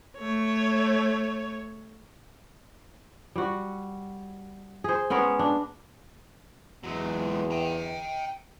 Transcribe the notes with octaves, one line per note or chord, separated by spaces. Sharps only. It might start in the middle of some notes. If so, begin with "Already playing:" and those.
A3 C#5
G3 F#4
G#4 C5
G#3 B3 C#4 A#4
D4
E2 F#3 G#3
G5 A#5